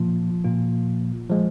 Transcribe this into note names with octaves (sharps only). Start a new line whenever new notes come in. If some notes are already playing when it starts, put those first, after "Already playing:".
Already playing: A#2 F3 A#3 F4
A#2 A#3 F4
F3 G#3